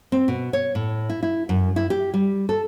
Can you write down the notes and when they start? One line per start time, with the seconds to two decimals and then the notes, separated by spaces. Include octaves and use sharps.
0.12 C4
0.28 B2
0.53 C#5
0.75 A2
1.10 E4
1.23 E4
1.49 F#2
1.76 E4
1.90 G4
2.14 G3
2.49 A4